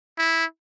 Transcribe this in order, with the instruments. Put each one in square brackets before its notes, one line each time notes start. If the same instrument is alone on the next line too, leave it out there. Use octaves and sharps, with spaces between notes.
[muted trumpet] E4